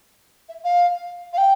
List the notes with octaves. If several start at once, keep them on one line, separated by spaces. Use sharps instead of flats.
E5
F5
F5
G5